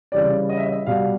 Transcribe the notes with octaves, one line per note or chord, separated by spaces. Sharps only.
C#3 E3 G3 D5
D#5
E5
D#5
B2 G3 F5